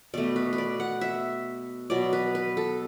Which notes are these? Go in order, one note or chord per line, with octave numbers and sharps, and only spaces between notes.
B2 A3 D5
B4
B4
D5
F#5
E5
B2 F#3 B3 D5
B4
B4
A4